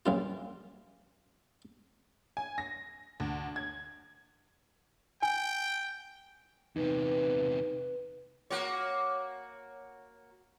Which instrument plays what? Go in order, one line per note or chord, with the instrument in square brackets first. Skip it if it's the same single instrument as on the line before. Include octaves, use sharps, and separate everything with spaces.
[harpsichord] A#1 F#2 F4
[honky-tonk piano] G#5
A#6
D2
G#6
[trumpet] G5 [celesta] G#5
[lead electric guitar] E2 C3 [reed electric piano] D#4 [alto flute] B4
[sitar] A#3 F#4 C#5